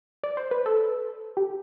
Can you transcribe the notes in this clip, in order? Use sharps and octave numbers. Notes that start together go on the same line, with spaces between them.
D5
C5
B4
A4
G4